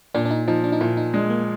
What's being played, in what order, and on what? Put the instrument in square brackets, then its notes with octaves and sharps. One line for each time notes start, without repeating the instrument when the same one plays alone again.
[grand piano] A#2 [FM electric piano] D4
[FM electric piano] D4
D#4
[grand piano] F3 [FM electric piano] D#4
[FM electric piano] D4
D#4
[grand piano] A#2 [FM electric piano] E4
[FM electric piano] D#4
[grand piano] G#3 [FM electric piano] D4
[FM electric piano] A#3